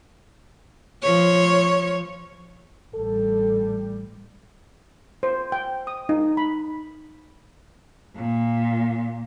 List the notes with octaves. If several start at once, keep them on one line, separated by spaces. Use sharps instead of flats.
F3 C#5
A1 G3 A4
C5
G5
D#6
D#4
B5
A#2